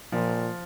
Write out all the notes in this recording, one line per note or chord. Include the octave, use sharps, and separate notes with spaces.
A#2 F3